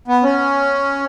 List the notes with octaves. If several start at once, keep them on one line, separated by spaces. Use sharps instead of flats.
B3
C#4